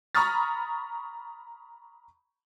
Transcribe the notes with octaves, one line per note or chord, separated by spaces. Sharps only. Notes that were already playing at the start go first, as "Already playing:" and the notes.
A#5 B5 C#6 D#6 F6 A6